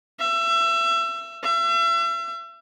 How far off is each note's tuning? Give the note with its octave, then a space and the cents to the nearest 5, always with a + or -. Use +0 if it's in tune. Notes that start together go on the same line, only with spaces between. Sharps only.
E5 +30
E5 +40